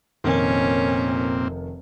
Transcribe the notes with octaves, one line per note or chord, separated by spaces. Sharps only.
F1 A#2 D#3 C4 C#4